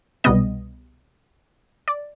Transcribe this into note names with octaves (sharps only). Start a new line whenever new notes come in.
C2 B2 G3 B3 D#5
D5